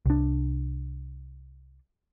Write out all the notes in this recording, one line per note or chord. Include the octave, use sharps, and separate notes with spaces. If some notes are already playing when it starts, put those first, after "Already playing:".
C2 D4